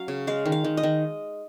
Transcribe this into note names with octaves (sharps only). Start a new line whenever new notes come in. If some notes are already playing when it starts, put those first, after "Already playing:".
Already playing: F#3 C#4 F5
C#3
G#3 F5
D#3
F5
D#3
D#5
D#3